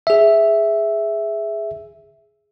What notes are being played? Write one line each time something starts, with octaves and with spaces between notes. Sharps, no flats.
G#4 E5